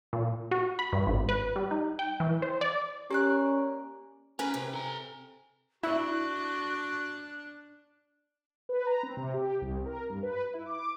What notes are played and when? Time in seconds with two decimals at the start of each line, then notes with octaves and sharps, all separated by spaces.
0.13 A#2
0.51 F#4
0.79 B5
0.93 G2
1.07 G#1
1.29 B4
1.56 G3
1.71 D#4
1.99 G5
2.20 E3
2.42 C5
2.61 D5
3.10 A#3 C#4 G4 D5 F#6
4.39 C#4 A#4 B4 G#5 A#5 B5
4.54 C3
4.74 A4 A#5
5.83 D4 E4 F#4 D5 F#6
8.69 B4
8.86 A#5
9.03 C4
9.17 C3
9.34 G4
9.62 C2
9.86 A#4
10.10 G2
10.23 B4
10.54 E4
10.65 D6